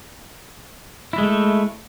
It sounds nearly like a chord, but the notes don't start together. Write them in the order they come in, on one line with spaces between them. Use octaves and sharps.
E4 G#3 A3